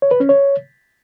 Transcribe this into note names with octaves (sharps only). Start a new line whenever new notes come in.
C#5
B4
C#4
C#5